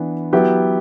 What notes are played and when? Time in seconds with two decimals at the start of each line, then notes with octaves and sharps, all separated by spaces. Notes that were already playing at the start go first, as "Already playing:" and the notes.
Already playing: E3 B3 D4
0.33 F#3 B3 E4 G4